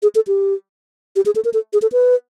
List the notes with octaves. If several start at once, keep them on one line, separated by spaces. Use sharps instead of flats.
G#4
A4
G4
G4
G#4
A4
A#4
A4
G#4
A4
B4